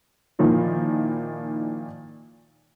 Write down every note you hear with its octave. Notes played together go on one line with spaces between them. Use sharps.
A#2 D#3 F3 D#4 E4